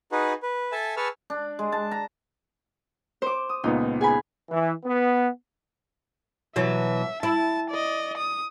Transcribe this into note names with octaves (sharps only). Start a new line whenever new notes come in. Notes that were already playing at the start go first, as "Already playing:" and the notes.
D#4 F#4 G#4 B4
B4
A4 E5 G#5 A5
G#4 B4 A5 C#6 E6 F6
D4
G#3
A5
A#5
C5 D6
D#6
C#2 A#2 B3 D#4
G#4 G#5 B5
E3
B3
B2 E3 F#3 E5
E4 A5
D5 D#5
D#6